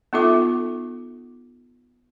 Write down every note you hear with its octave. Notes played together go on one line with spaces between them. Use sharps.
B3 D#4 F4 A4 E5 D6